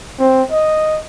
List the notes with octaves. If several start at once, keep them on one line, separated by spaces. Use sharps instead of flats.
C4
D#5